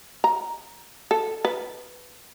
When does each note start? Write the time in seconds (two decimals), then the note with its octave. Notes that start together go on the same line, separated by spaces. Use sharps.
0.24 A#5
1.11 A4
1.45 B4